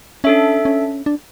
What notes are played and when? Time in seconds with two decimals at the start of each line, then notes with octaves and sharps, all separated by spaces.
0.24 C#4 D4 A4 E5
0.65 C#4
1.06 D4